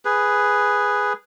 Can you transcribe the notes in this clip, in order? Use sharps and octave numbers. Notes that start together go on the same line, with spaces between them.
G#4 B4